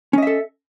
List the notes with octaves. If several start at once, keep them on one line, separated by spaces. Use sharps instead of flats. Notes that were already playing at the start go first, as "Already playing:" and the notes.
C#4 A4 D#5 E5